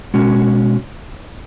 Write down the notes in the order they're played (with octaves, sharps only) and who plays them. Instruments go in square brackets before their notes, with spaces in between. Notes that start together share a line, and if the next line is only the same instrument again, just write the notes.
[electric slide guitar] B2 G#3 C#4 F#4